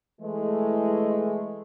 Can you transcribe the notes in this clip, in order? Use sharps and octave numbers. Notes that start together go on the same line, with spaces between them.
E3 G#3 A3